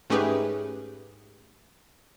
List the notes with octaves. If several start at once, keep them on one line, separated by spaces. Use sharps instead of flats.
G#2 A3 C#4 G4 G#4 B4